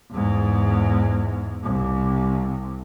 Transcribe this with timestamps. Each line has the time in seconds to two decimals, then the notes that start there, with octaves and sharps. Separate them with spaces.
0.11 E2 G#2
1.63 C2